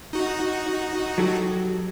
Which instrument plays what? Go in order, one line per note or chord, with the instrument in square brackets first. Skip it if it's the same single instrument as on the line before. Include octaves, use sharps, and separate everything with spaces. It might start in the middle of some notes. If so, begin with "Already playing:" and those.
[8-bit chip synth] D#4 F#4
[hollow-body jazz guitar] F#3 G4 A4